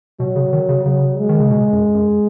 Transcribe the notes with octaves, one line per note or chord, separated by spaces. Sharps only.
B2 F#3
C#3
D#3
C#3
C#3 F#3
G#3
D#3
C#3
B2
F#2
F#2